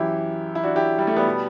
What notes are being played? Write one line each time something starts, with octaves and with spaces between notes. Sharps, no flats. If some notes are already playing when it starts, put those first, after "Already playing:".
Already playing: F#2 E3 E4 G4
E4
D4 F#4
E4 G4
G3
A3
G3 B3
B2